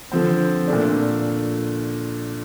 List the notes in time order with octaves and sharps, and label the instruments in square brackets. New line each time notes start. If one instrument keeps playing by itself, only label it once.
[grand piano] D3 F3 C4
A#2 A3 D4